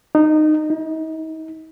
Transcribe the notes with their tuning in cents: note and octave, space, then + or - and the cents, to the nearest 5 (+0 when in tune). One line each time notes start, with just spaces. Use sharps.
D#4 -20
D#4 +35